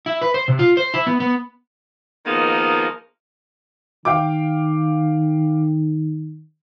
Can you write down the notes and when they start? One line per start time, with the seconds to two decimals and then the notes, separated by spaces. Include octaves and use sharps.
0.06 E4
0.22 B4
0.34 C5
0.48 C3
0.59 F4
0.77 C5
0.94 E4
1.07 B3
1.20 B3
2.26 D#3 F3 G#3 A#3 B3 A#4
4.05 D#3 F5 G5 D6